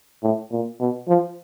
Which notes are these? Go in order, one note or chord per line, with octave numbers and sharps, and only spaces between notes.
A2
A#2
B2
F3